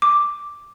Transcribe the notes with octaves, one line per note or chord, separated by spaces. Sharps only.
D6